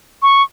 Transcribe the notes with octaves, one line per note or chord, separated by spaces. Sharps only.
C#6